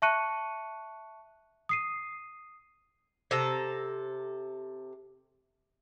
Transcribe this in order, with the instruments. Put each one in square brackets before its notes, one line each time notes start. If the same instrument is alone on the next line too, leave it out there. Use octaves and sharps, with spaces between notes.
[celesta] E5 A5 C#6 F#6 C#7 D#7
D#6 C7 D#7
[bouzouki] C3 A4 A#5